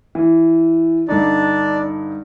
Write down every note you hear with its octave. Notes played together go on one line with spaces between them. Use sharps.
E3
G2 D3 D4 D#4 D5